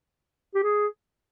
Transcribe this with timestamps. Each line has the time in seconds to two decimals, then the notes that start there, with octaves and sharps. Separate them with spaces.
0.54 G4
0.63 G#4